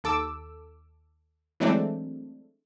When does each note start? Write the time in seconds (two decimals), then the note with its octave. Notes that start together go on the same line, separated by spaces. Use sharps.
0.04 D#2 A4 D6 E6
1.60 E3 F#3 G#3 A3 C4 D4